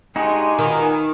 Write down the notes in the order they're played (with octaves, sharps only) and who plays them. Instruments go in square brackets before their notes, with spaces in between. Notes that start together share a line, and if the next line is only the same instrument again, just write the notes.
[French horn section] G2 G#3 [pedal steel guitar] D#4 F#4 G4 [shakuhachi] G#5
[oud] D#3 [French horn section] B3 F4 A#4